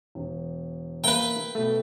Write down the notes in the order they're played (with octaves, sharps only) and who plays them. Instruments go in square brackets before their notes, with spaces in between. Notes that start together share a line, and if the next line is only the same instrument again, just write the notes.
[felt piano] E1
[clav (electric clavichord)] A#3 E5 A#5 [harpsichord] B4 G5
[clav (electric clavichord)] B2 A3